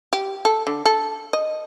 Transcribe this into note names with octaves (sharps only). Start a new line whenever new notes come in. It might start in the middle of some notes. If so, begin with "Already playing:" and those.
G4
A4
D3
A4
D#5